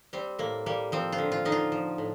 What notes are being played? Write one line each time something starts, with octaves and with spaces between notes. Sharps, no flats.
G3 C4
A2 A#3
G3 A#3
F3 C4
F4
D3
F4
D3 D#4
F4
F3
A2